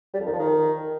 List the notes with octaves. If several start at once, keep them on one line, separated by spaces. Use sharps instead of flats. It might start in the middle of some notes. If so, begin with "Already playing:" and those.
G3
F2
D#3
F3
D#3